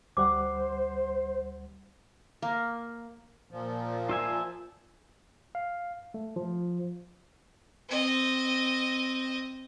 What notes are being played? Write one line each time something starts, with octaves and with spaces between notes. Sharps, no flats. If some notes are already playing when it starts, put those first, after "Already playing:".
D2 G3 C5 F#5 D6
A#3
A#2 F3
F4 E5 G#5
F5
A3
F3
C4 D#5